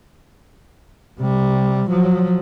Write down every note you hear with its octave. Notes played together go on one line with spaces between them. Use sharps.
C3 G3
F3 F#3